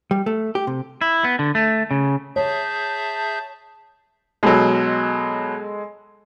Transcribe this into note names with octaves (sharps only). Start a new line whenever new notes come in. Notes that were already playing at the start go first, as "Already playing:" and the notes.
G3
A3
G4
C3
E4
B3
D3
A3
C#3
G#4 C#5 E5 A5 G6
B2 F#3 G#3 G#4 A4